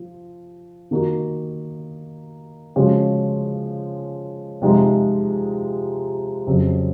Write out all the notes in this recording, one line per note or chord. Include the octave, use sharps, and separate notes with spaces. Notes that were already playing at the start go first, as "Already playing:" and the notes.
Already playing: F3
D#3 A#3 D#4 F#4
C#3 F3 G#3 C#4 F#4
C3 F3 G#3 D#4
F2 C#3 F#3